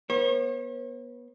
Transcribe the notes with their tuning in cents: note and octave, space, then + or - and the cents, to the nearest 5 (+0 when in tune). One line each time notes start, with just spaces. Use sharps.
B3 -30 C#5 -45